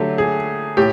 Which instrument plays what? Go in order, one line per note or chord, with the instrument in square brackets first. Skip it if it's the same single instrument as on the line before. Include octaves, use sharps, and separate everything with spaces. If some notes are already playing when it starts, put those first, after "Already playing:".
Already playing: [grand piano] D3 F#3 A3 [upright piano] G4
[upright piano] G#4
[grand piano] A2 [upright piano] G4